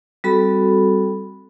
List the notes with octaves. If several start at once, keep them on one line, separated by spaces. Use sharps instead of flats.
G3 C4 F#4 A4 B5